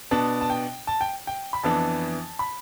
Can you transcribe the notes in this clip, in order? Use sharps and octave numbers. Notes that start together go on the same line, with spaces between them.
B2 B3 D4 A5
A5
G5
A5
G5
G5
B5
F2 E3 B3 D4 A5
B5